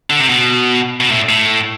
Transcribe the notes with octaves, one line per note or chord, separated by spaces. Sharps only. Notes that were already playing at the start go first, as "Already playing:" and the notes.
D3
C3
B2
B2
A2
A2